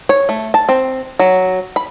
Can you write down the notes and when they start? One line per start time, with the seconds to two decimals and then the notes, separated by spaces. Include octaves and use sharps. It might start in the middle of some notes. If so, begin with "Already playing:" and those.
0.09 C#5
0.29 A3
0.54 A5
0.69 C4
1.19 F#3
1.76 B5